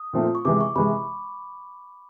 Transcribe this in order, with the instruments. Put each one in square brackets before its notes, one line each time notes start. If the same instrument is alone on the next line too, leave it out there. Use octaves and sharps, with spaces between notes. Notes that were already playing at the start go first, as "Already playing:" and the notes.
Already playing: [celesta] D#6
[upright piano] A#2 F3 A3 C4
[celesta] C#6
[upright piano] C3 E3 G#3 [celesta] D6
[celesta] C#6
[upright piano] C3 E3 G#3 [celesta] B5